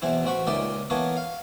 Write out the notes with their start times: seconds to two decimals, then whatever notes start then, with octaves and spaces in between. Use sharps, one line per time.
0.02 E2 B2 E3 C4 E4
0.24 A1 C4 F#4 B5 C#6
0.47 C#2 A#2 D#4 D5 E5 G5
0.90 E3 A#3 B3 A4 C#5
1.17 F5